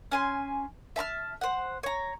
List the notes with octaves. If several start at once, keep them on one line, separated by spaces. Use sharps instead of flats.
C#4 G#5 C6
E5 A5 B5 F6
C5 F#5
C#5 A#5